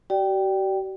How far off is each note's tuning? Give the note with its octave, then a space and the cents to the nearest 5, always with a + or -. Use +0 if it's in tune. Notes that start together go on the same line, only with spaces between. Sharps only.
G4 -45 D5 +0 G5 -5